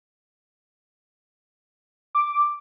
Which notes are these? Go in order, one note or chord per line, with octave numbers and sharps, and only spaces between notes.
D6